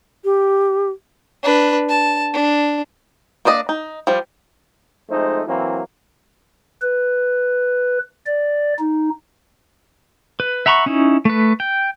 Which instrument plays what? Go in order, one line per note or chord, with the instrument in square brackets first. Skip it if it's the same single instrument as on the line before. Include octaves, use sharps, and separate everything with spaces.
[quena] G4
[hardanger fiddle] D4 B4
A5
D4
[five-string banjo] A#3 D4 D5 D#5
D#4
F3 G3
[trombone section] F2 G#3 A3 D#4 C5
E3 F#3 A#3 C4 E4
[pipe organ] B4
D5
D#4
[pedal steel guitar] B4
E5 F#5 A#5 B5 C#6
C#4 D#4 E4
A3 B4
G5